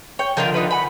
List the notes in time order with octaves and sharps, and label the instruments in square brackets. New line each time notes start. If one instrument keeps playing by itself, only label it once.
[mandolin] C#5 G5
[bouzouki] D3 D#3 F3 [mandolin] F4 A#4 G5
[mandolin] D#4 F4 B4
F#5 G#5 B5